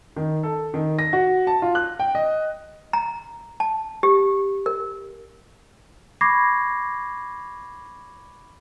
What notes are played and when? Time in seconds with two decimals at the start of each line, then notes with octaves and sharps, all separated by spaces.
0.16 D#3
0.43 A4
0.74 D#3
0.99 A#6
1.13 F#4
1.47 A5
1.62 F4
1.75 F#6
2.00 G5
2.15 D#5
2.93 A#5
3.60 A5
4.03 G4
4.66 A#4
6.21 B5 C#6 D6 G#6 A#6 C7